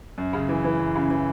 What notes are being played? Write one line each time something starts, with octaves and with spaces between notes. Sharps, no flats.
F#2
C#3
E3
E3
F#2
C#3
E3